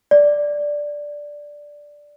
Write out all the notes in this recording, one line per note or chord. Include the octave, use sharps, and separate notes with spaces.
D5